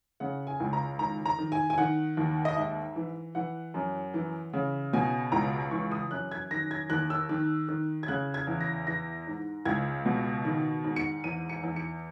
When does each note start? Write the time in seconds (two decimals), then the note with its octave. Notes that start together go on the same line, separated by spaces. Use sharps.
0.20 C#3 F#5
0.47 G#5
0.60 C#2
0.73 A#5
0.99 D#3 A#5
1.26 A#5
1.38 D#3
1.52 G#5
1.70 G#5
1.78 D#3 F#5
2.17 D#2
2.45 D#5
2.56 G#2 E5
2.96 E3
3.35 E3 F#5
3.74 F#2
4.14 E3
4.53 C#3
4.93 B2 G#5
5.32 C#2 A#5
5.71 E3 C#6
5.92 D#6
6.11 F#2 F#6
6.31 G#6
6.51 D#3 A#6
6.71 G#6
6.90 D#2 F#6
7.10 E6
7.29 D#3
7.68 D#3
8.03 G#6
8.08 C#3 F#6
8.34 G#6
8.47 E2
8.61 A#6
8.87 E3 A#6
9.27 G#2
9.65 C#2 G#6
10.05 B2
10.45 D#3
10.84 G#2
10.96 C#7
11.24 E2 D#7
11.49 C#7
11.63 E2
11.76 C#7